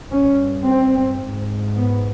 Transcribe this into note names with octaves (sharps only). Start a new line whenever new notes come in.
G2 C#4
C4
G#2
B3